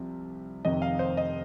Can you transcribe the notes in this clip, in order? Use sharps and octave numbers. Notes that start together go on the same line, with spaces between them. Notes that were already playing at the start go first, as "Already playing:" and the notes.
Already playing: C2 C3 F3
F1 F2 C3 D#3 D#5
F5
C5
D#5